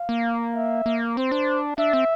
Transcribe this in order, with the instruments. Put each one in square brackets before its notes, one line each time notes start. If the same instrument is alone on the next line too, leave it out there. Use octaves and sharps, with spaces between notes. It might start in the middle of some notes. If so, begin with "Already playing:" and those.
Already playing: [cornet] F5
[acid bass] A#3
[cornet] E5
[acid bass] A#3
[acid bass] C4 [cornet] C5
[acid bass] D4
[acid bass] D4 [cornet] E5
[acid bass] C4